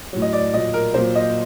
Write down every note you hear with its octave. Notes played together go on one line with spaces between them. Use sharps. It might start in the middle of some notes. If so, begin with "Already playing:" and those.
A2 F#3
D#5
D5
A#2 F#3 D#5
A#4
A#2 F#3 C5
D#5